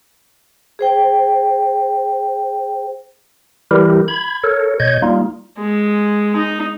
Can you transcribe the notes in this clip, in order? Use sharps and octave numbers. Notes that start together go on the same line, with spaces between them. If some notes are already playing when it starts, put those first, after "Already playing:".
G#4 C5 G5
E3 G3 E4 G4 A#4
B5 G#6
A4 A#4 C#5
B2 C#5 D#5 G6 G#6
G3 A#3 D#4 F4
G#3
D#4